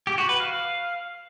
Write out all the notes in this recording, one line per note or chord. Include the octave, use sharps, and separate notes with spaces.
G4
F#4
B4
F5